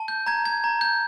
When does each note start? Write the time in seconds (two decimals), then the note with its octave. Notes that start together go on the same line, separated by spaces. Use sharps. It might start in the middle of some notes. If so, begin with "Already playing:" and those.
Already playing: A5
0.08 G6
0.26 A#5 G#6
0.45 G#6
0.64 A#5
0.81 G6